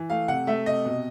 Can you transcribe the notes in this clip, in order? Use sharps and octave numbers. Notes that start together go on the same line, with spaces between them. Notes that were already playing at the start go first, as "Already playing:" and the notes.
Already playing: E3
A3 F5
C3 F#5
A3 E5
C3 D#5
B2